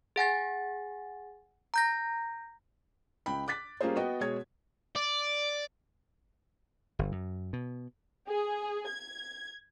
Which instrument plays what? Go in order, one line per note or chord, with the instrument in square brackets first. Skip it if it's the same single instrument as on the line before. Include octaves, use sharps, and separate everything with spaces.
[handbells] G#4 F#5 G#5 A6
A#5 G6 A#6
[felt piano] C#2 G5 B5
D6 F#6 A6 B6
G3 A#3 C#4 F4 G#4 C5
B3 F#4 D#5 G5
B2 G#3 G#4 C#5 G#6
[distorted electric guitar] D5
[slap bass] G1
F#2
B2
[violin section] G#4
G#6